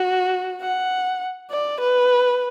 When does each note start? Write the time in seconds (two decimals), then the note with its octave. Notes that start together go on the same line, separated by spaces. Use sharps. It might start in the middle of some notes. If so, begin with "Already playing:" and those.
Already playing: F#4
0.62 F#5
1.51 D5
1.81 B4